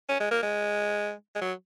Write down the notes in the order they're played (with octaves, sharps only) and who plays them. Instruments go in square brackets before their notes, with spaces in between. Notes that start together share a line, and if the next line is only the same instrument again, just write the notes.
[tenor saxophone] C#4
G#3
A#3
G#3
G#3
F#3